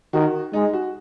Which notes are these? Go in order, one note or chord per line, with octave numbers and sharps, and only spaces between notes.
D#3 F#4
G#3 D#4
F#4